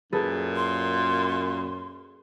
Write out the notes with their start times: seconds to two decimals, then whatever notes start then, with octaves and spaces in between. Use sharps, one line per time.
0.12 F#2 A#2 G#4 A4 B4
0.56 C6